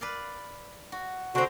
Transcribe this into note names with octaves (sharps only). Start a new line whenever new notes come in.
B4 D5 F5
F#4
D3 C4 F#4 C5 A#5